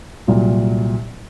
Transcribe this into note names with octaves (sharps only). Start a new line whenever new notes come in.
C2 A#2 F#3